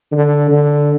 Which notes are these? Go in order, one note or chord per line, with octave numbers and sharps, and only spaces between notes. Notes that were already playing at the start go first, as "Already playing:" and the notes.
D3
D3